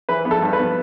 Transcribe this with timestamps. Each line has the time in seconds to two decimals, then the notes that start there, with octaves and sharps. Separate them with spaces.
0.09 E3 B4
0.25 B3
0.31 A4
0.42 G2
0.53 B4
0.59 B3